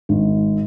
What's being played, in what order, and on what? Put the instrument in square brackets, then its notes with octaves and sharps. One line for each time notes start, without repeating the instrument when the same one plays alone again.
[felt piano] G#1